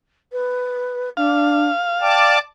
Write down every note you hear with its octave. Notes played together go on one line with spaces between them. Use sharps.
B4
D4 F5
D5 G5 A5 D6